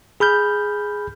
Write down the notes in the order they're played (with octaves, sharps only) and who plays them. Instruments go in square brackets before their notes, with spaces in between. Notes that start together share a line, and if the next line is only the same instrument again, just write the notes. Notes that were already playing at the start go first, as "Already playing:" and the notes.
[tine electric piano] G#4 B5 F6 G6